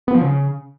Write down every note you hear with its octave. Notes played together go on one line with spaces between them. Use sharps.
B3
F3
C#3